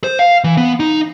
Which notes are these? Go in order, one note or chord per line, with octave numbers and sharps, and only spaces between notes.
C5
F5
E3
B3
D#4